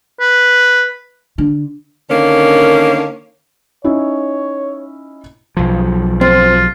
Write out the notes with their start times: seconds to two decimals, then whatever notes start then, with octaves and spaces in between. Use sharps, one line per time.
0.21 B4
1.38 D3
2.10 D3 D#3 A#3 C#4
3.85 C#4 D#4 E4 C#5
5.57 B1 F3
6.21 C4 F4